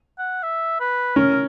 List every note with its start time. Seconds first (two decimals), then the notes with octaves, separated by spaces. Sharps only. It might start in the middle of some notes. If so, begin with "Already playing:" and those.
0.18 F#5
0.43 E5
0.80 B4
1.16 C#4 A#4